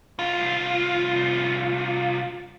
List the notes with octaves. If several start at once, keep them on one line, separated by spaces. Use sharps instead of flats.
C2 F4